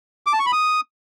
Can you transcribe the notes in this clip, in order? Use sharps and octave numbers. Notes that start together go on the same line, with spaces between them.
D6
A5
C#6
B5
D#6